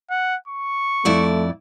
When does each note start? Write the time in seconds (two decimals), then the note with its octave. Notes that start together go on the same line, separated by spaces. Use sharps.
0.10 F#5
0.47 C#6
1.05 F2 A3 E4 D5